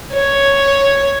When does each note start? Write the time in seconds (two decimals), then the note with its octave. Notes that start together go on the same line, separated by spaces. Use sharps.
0.13 C#5